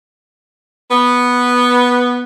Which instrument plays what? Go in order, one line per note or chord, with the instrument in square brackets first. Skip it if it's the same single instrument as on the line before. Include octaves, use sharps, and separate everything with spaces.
[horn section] B3